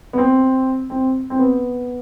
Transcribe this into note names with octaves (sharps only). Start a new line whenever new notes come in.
B3
C4
C4
C4
B3